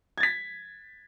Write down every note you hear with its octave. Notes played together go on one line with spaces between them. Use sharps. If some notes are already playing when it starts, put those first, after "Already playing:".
G#6 A6 B6